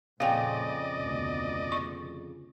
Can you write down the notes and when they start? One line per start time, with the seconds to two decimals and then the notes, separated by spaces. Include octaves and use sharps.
0.20 F2 A#2 C#3 D5 D#5 F5 G5
0.97 F1 D2 B2
1.72 C#6